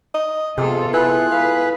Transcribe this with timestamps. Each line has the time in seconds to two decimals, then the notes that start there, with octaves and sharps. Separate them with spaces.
0.14 D#5
0.58 C3 B3 F4 G#4 A4
0.94 E4 G#4 B4 F#6
1.32 B4 F5